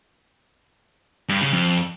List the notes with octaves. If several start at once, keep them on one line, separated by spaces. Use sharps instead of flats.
G2
C#3
F2